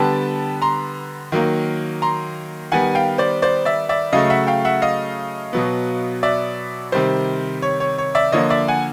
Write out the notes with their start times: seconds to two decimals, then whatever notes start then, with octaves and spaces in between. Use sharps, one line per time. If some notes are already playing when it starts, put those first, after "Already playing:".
Already playing: D3 G3 B3 G5 A5
0.62 A#5 C6
1.32 D#3 F#3 A#3
2.02 A#5 C6
2.72 D#3 G3 B3 F#5 G#5
2.95 F5 G5
3.18 C5 D5
3.42 C5 D5
3.65 D5 E5
3.89 D5 E5
4.13 C#3 F#3 A3 D#5 F5
4.30 E5 F#5
4.47 F5 G5
4.65 E5 F#5
4.82 D#5 F5
5.53 B2 F#3 B3
6.23 D5 E5
6.92 C3 D#3 G3 C5
7.62 C#5
7.80 C#5
7.98 C#5
8.15 D5 E5
8.32 D3 F3 A#3 C#5 D#5
8.50 D5 E5
8.68 F#5 G#5